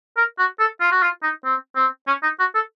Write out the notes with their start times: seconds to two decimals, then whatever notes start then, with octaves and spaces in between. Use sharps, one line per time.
0.17 A#4
0.39 F#4
0.60 A4
0.81 F4
0.92 F#4
1.02 F4
1.23 D#4
1.45 C4
1.76 C4
2.08 C#4
2.23 D#4
2.39 F#4
2.55 A4